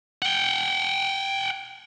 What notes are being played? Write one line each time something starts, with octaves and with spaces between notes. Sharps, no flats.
F#5 G5